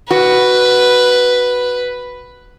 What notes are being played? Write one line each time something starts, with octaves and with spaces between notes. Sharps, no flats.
F#4 B4